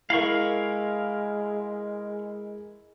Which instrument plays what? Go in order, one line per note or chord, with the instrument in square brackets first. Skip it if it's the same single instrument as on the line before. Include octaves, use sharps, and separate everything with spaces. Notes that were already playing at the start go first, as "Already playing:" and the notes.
[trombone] G#3 [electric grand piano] E4 A#4 [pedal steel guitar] F5 B5 C#6